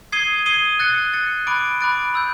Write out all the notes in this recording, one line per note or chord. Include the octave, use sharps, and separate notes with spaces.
D#6 G#6 C7 D#7 G7
D#6 G#6 C7 D#7 G7
F#6 A6 C#7
F#6 A6 C#7
B5 D6 F#6 A6 D7
B5 D6 F#6 A6 D7
B5 E6 G6